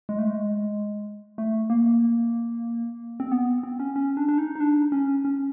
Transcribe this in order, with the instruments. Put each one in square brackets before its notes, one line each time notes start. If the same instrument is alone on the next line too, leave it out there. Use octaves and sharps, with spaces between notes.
[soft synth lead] G#3
A3
G#3
A3
A#3
C4
B3
C4
C#4
C#4
D4
D4
D#4
D#4
D4
C#4
C#4